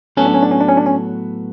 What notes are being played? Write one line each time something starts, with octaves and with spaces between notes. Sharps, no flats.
A2 F#3 B3 C#4 F#4 A4
D4
C#4
D4
C#4
D4
C#4
D4
C#4